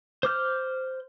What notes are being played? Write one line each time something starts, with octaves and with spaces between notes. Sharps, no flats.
C5 D6 F6 G6